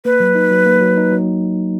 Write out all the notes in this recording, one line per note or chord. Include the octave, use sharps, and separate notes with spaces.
A#3 B4
F#3
D#4
F#3
A#3
F#3
D#4
F#3